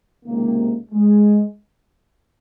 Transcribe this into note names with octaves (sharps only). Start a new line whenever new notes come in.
C#2 C3 D#3 A#3
G#3